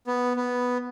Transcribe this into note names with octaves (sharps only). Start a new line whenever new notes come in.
B3
B3